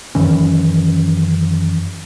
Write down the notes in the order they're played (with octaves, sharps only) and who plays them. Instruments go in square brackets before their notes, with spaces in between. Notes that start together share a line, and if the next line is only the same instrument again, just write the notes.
[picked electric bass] F#2 D#3 E3 C#4